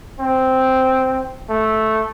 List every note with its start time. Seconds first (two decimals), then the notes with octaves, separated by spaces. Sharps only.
0.20 C4
1.50 A3